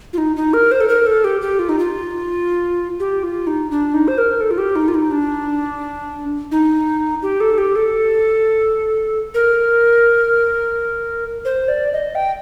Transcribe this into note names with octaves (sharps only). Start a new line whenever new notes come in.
F4
D#4
D#4
A#4
C5
A4
A#4
A4
G4
G4
F4
D#4
F4
G4
F4
D#4
D4
D#4
C5
A#4
A4
F4
G4
D#4
F4
D#4
D4
D#4
G4
A4
G4
A4
A#4
C5
D5
D#5
G5